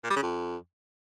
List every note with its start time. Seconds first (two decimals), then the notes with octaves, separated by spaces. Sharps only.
0.04 A#2
0.10 G3
0.16 C#3
0.23 F2